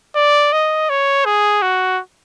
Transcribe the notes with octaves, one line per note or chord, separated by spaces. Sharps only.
D5
D#5
C#5
G#4
F#4